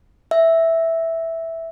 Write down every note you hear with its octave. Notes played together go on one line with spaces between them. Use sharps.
E5